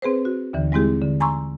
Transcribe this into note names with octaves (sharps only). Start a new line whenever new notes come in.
C4 G#4 B4 C5
F#4
D#2 D3 E3
G3 G#3 C4 E4 G4 G#4
D3
G#5 A#5 C6 C#6 E6